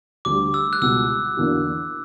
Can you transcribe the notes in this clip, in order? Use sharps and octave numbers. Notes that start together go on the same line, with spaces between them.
D2 D3 G3 D6
E6
F#6
C#2 B2 G3 E6
E2 D3 A#3 D4 F#4